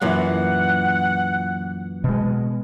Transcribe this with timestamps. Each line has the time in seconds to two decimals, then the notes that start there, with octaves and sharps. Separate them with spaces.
0.02 F#2 A#2 E3 F#5
2.04 B2 G#3